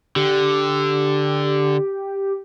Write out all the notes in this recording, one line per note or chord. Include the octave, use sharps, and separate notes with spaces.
D3 G4